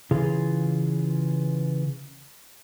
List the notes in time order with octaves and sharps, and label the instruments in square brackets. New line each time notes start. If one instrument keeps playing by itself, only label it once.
[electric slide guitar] C#3 E3 F4 G#4